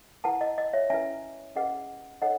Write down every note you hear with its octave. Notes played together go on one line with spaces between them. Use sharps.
E4 B4 F#5 A5
D#5
D#5
C#5 E5
C#4 E4 B4 E5 G#5
C#4 G#4 B4 D#5 F#5
D#4 A4 C#5 D#5 F#5